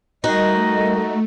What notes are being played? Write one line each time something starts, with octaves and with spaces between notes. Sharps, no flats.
G3 A3 D#4 F#4 A#4 D#5